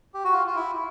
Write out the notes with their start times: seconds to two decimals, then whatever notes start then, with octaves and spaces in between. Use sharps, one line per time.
0.14 G4
0.24 F#4
0.33 F4
0.47 F4
0.56 E4